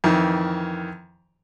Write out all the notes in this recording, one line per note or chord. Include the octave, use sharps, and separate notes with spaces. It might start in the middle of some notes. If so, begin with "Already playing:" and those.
F2 D#3 E3